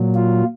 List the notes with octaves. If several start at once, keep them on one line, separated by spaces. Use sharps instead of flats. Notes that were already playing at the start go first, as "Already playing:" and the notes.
Already playing: A#2 F#3
F4